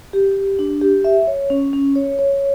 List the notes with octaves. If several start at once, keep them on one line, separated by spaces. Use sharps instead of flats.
G4
G4
D4
G4
E5
C#5
C#4
C#4
C#5
C#5